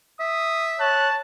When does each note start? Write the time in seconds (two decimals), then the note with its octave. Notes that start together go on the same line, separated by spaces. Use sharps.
0.20 E5 D#6
0.80 C#5 A5 F#6